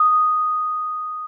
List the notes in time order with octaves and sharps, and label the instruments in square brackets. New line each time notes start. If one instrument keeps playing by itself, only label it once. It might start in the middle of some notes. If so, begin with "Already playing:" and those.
Already playing: [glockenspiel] D#6